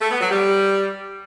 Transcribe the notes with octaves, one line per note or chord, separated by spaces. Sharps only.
A3
B3
F#3
G3